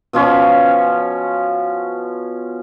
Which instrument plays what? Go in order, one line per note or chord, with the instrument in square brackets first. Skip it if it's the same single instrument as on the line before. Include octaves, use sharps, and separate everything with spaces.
[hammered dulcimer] B2 F3 C#4